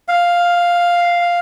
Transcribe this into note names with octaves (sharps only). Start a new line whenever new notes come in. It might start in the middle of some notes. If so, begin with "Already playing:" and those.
F5